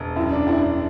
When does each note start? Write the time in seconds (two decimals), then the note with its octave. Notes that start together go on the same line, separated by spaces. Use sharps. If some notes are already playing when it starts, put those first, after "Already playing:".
Already playing: E1
0.16 F#2 E4
0.32 D4
0.47 F#2 E4
0.62 D4